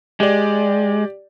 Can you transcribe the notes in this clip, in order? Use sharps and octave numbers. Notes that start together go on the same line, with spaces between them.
G#3 G4 D5